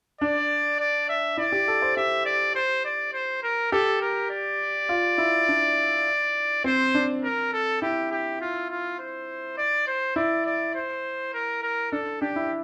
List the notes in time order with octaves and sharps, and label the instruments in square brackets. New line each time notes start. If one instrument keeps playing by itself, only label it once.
[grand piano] D4 [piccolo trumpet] D5
[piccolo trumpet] D5
E5
[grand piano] E4 [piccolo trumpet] D5
[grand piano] G4
A4
C5
[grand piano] G4 [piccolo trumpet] E5
[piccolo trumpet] D5
C5
D5
C5
A#4
[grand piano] G4 [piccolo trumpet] A4
[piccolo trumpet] A#4
D5
[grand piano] F4
E4
D4
[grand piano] C4 [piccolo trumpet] C5
[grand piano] D4
[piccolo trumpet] A#4
A4
[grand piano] E4 [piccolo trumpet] G4
[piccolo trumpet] G4
F4
F4
C5
D5
C5
[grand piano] E4 [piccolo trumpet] D5
[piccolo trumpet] D5
C5
A#4
A#4
[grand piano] D4 [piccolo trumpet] A4
[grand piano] D4 [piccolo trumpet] G4
[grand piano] E4